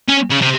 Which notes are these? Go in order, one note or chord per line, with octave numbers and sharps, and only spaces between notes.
C#4
C#3
C3